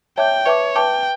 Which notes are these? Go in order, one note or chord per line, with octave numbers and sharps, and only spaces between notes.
C#5 E5 G5 A5 D6 G6
B4 C#5 E5 A5 D6
B4 E5 G5 A5 D6